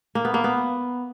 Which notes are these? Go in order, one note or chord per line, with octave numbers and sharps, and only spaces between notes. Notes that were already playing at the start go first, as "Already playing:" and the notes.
A#3
B3
A#3
B3